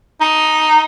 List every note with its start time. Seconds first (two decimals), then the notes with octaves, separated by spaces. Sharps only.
0.21 D#4